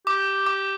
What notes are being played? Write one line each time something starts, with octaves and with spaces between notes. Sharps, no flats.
G4 D6
D6